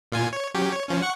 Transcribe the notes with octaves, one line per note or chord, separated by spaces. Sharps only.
A#2 F4 G#5
C#5
F#3 C#4 G4
C#5
F3 C#4
F#5 C#6